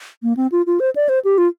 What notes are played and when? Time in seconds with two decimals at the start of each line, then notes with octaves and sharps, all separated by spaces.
0.23 A#3
0.37 C4
0.52 F4
0.66 F4
0.80 C5
0.95 D5
1.09 C5
1.24 G4
1.38 F4